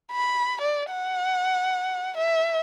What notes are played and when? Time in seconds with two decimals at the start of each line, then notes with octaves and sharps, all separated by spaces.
0.12 B5
0.62 D5
0.91 F#5
2.17 E5